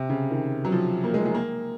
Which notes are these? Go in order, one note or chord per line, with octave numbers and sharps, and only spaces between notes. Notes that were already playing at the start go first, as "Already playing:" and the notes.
Already playing: C3
C#3
D#3
F#3
F3
A#3
G#3
G#3
A#3